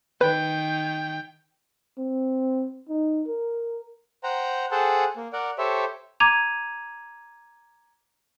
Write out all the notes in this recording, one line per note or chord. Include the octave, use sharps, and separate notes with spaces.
D#3 B4 G5
C4
D#4
A#4
C5 F#5 G5 A#5
G#4 A4 C5 F#5 G5 A5
A#3
A#4 D5 F#5
G4 A4 C5 C#5 E5
A#5 D6 G#6 D#7 F7